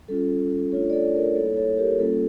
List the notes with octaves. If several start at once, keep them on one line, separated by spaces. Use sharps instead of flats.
G3 C#4 F4 A4
A3 D4 F4 A4 C#5
D5
A4 C#5
A#4 D5
G3 A#3 E4 A4 C#5
A4 C#5
G4 A#4
G3 A#3 C#4 F4 A4